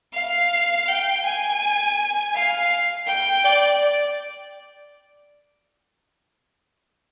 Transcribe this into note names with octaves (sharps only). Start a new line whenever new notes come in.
F5
G5
G#5
F5
G5
D5